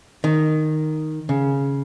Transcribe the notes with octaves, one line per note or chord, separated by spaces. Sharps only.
D#3
C#3